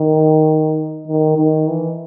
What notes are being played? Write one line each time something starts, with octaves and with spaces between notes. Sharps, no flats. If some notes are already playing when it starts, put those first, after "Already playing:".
Already playing: D#3
D#3
D#3
E3